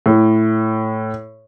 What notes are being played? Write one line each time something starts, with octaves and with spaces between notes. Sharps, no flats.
A2